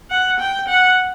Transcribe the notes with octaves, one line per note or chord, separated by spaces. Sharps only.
F#5
G5
F#5